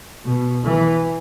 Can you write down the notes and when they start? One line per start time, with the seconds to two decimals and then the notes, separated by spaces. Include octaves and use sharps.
0.25 B2
0.64 E3